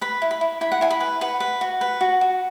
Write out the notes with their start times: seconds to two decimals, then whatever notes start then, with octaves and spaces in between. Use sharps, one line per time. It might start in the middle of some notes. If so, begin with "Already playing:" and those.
0.01 B4 B5
0.22 E4
0.31 B5
0.41 E4
0.61 E4 B5
0.72 F#5
0.81 E4 G#5
0.90 B5
1.00 B4
1.21 B4 F#5
1.40 B4
1.61 F#4
1.81 B4
2.01 F#4
2.21 F#4